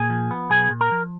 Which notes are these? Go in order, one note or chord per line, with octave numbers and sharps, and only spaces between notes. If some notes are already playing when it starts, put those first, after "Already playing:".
Already playing: A#2 G#4 G#5
F3
B3
B1 G#4 G#5
A#2
A#4 A#5
F3